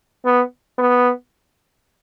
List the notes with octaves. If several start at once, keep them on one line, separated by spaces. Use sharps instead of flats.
B3
B3